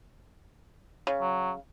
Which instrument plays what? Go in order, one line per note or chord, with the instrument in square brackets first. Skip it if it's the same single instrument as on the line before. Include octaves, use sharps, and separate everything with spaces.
[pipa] C#3
[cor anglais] F#3